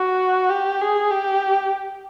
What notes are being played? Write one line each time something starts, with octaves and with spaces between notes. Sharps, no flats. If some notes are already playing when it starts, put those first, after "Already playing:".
Already playing: F#4
G4
G#4
G4